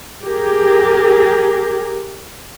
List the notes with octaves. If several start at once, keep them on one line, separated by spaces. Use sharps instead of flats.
G4 G#4 A#4